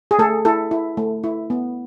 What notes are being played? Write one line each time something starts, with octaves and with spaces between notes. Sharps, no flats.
G#4
A3 A4
E4 A4
E4
A3
E4
B3